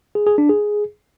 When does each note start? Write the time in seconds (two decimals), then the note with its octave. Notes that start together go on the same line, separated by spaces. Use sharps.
0.15 G#4
0.27 G#4
0.38 D4
0.49 G#4